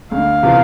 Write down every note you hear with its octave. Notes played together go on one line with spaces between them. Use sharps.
D2 F5
C3 E3 B3 F4